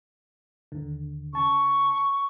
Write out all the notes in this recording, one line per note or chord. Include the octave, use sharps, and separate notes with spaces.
D#2 D3
C#3 A5 C#6